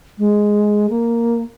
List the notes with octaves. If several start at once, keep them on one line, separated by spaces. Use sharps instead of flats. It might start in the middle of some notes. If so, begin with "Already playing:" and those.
G#3
A#3